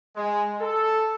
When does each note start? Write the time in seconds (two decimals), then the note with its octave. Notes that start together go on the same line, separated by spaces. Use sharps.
0.16 G#3
0.61 A4